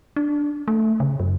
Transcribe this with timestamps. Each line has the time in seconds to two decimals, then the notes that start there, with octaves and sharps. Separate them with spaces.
0.16 D4
0.68 A3
1.00 C#3
1.20 F#2